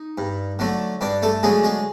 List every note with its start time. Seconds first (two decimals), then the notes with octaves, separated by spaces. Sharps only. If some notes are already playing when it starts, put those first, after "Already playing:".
Already playing: D#4
0.18 G2
0.59 D3 F#3 A3
1.01 G2 D4 D5
1.22 A3 A4
1.43 D3 F#3 G#3 A3 G#4
1.63 G#3 G#4